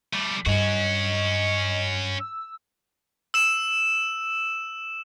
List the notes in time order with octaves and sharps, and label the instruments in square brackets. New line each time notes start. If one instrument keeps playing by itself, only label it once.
[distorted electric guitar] G3 A3
[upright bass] G2 [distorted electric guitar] C#4 F#4 [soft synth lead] D#5
[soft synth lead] E6
[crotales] E6 E7